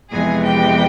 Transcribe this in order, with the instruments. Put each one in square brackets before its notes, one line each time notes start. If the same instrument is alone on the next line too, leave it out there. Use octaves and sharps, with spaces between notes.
[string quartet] F2 C3 E3 G#3 B3 G#4 G#5
G4 G5